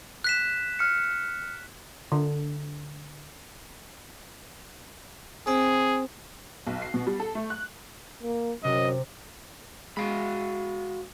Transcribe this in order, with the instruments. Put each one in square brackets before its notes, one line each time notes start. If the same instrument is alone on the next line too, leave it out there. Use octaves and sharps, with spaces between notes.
[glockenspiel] F#6 B6 E7
[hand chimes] F6 C#7
[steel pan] D3
[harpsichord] C4 [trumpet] G#4
[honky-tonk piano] B1
C7
B2
G3
A4
A3
F#6
[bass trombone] A#3
[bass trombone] F#2 [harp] C3 [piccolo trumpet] D#5
[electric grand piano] G#3 [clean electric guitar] F#4 F5 B5